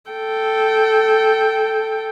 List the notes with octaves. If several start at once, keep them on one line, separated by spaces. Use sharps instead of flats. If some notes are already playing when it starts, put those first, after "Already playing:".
A4 G5